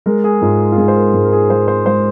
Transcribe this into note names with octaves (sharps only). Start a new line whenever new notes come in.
G#3 A#4
G#4
G#2 F4
F4
G#2 G#4
C5
A#4
G#2 A#4
A#4
G#4
G#3 C5
C5
G#3 C5